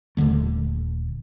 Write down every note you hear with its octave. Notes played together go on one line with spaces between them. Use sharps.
D#1 D#2 D3 A3